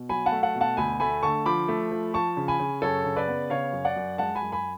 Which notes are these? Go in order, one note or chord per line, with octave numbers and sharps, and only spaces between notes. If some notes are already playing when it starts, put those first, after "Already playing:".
Already playing: B2
F#3 G#5 B5
F#5 A5
A3
F#5 A5
B2
F#5 A5
D2 G#5 B5
A3 G#5 B5
D3 A5 C#6
F3 B5 D6
A3
F3
F3 A5 C#6
C#3
G#5 B5
C#3
F#2 A4 C#5
C#3
B4 D5
B3
C#3 C#5 F5
F#2
D5 F#5
F#2
G#3 F#5 A5
G#5 B5
F#2
G#5 B5